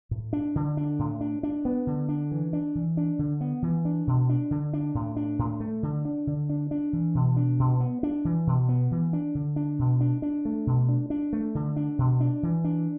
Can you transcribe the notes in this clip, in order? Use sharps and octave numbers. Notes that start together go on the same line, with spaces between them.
A2
D4
D3
D4
A2
D4
D4
B3
D3
D4
E3
D4
E3
D4
D3
B3
E3
D4
B2
D4
D3
D4
A2
D4
A2
A3
D3
D4
D3
D4
D4
E3
B2
D4
B2
B3
D4
E3
B2
B3
E3
D4
D3
D4
B2
D4
D4
A3
B2
D4
D4
A3
D3
D4
B2
D4
E3
D4